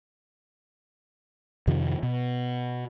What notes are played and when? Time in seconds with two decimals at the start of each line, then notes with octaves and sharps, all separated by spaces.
1.67 F2 C3 D#3 F3
2.03 B2